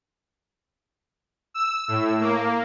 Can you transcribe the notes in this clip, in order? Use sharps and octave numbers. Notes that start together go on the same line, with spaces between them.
E6
A2
A#3